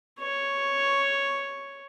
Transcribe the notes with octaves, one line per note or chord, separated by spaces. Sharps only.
C#5